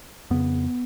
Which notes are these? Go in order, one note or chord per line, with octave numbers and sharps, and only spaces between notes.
F2 C#3 B3